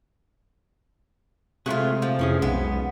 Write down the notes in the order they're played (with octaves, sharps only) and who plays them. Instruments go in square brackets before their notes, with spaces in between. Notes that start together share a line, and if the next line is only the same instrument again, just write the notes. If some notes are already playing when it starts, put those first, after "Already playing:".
[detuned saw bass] C3 [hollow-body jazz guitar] G#3 A3 G#4 [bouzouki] F4 F#4
[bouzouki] F3
[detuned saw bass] F2 [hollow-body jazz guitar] E3 C#4 G#4
[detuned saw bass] B1 [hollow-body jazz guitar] G#3 [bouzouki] B3